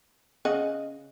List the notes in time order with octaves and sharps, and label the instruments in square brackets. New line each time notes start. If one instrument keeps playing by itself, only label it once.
[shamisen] C#3 D#5 F#5